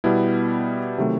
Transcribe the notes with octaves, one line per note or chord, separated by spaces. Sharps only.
B2 G3 B3 E4
C3 D#3 F#3 A3